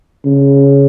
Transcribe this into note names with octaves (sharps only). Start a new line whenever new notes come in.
C#3